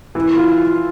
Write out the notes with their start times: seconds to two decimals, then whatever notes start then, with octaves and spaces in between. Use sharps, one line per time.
0.15 E3
0.37 F4